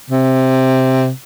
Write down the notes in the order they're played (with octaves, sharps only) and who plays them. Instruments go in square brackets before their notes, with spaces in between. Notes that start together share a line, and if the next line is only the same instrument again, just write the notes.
[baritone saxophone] C3